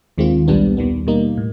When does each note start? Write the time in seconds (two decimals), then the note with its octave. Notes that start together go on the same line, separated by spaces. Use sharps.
0.18 D#2 D#3 G#3 C4 F4
0.48 B1 A#2 G3 B3 D4
0.77 D#2 D#3 G3 B3
1.07 B2 G3 A#3 D#4
1.37 A2